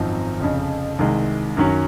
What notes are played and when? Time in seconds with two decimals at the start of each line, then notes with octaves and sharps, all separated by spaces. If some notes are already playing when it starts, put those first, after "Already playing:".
Already playing: G#1 F#2 F3 C4 D#4
0.40 F1 F2 C#3
0.99 C2 C3 D#3 G#3
1.57 F#2 D#3 F#3 C#4